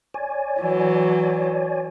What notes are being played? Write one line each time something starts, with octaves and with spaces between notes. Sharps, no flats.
C#5 D5 G#5
E3 F#3